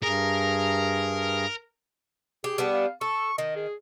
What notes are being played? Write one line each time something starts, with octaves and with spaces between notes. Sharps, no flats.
G2 G#4 A#4
G4 G#4
G3 B3 D4
F5
A4 C#6
D#3 D#5
G#4